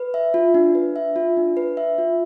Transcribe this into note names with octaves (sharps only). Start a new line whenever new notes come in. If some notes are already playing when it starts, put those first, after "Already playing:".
Already playing: B4
E5
F4
D4
B4
E5
F4
D4
B4
E5
F4